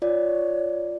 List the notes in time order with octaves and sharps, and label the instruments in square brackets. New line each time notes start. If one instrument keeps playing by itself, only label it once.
[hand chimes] F4 D5 [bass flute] C#5